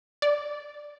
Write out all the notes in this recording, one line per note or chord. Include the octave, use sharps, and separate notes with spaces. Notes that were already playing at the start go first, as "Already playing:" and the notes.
D5